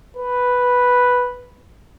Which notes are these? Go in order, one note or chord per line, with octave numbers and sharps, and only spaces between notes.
B4